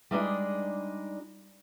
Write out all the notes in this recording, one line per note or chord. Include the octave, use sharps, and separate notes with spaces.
G3 G#3 D4 D#4